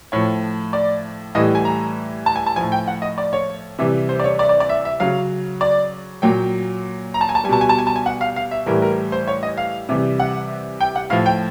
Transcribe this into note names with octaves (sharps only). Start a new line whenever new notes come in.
A2 F3 C#5
D5
A2 E3 G3 D#5
G#5
A#5
A5
G#5
A5
A2 F3 G#5
G5
F#5
D#5
D5
C#5
C3 E3 G3
C5
D5
C#5
D5
D5
D5
E5
E5
C#3 F#3 F5
D5
A#2 F#3 G5
A#5
A5
G#5
A5
G3 G#5
B2 A5
G#5
A5
G#5
A5
G#5
F#5
F5
F5
E5
A2 E3 G3 A#4
A#4
C5
C#5
D#5
F5
C3 E3 G3
F#5
G5
F#5
A2 F3 F5
G5